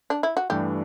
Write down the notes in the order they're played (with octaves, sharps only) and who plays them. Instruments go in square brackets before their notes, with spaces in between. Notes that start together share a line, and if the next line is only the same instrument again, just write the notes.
[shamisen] D4
E4
F#4
[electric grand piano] G2 E3 A3 D4 [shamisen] G4